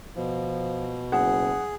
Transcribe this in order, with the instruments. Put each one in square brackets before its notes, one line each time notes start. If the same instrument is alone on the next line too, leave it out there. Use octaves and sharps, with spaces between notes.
[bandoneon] B2 [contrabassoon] F3
[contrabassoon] F#1 [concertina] G#4 [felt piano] F#5